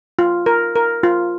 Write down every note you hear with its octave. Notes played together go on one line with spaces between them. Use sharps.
F4
A#4
A#4
F4